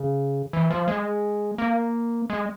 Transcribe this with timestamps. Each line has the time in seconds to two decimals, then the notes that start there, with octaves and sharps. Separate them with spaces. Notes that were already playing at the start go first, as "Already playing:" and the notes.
Already playing: C#3
0.53 E3
0.71 F3
0.88 G#3
1.58 A#3
2.30 G#3